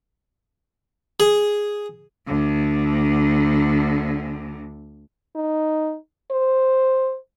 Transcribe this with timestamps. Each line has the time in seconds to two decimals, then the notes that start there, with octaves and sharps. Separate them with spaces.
1.20 G#4
2.27 D2 D3
5.36 D#4
6.31 C5